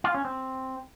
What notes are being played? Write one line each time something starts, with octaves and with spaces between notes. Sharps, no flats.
F4
C#4
C4